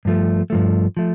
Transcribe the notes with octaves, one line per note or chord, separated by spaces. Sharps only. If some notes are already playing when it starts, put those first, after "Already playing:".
G2 F3 A3
G2 F3 A3
F3 A3